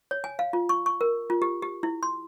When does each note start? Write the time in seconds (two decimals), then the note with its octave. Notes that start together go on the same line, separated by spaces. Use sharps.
0.11 C#5
0.24 G#5
0.39 F5
0.53 F4
0.69 C#6
0.86 C#6
1.01 A#4
1.30 F4
1.42 G4
1.62 G4
1.83 E4
2.03 C6